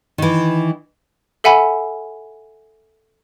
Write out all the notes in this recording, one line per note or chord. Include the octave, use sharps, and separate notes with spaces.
D#3 E3
A4 E5 F#5 G#5 B5